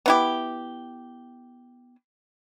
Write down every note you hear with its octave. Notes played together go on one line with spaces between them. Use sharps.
B3 E4 G4